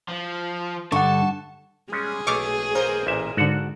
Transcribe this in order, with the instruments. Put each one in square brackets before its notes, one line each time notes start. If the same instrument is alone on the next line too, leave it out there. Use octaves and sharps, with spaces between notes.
[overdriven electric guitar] F3
[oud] G2 [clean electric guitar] D3 [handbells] F#5 C#6 [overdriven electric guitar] A5
[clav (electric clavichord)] G3 G#3 C#4 [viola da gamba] G#4
[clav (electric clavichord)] B1 A3 F5 [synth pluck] C#6 D6 F6
[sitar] A#3 A#4 C5
[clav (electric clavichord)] A1 A#2 E5
[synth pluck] G#2 D3 [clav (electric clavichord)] F#4 A4 F#5